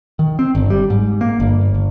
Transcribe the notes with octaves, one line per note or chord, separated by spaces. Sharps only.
D#3
C4
G1
G3
G#2
A#3
G1
G1